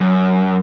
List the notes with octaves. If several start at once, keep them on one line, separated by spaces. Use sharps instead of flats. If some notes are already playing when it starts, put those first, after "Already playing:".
F#2